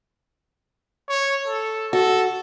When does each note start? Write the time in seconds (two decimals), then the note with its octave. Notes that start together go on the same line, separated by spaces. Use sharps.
1.09 C#5
1.47 A4
1.93 F#4 A4